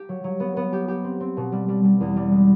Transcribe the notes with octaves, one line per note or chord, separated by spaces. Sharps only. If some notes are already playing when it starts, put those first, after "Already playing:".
Already playing: G4
F#3
F#3
B3
B3
G4
G4
C4
C4
B2
G3
G3
G3
E2
G3
G#3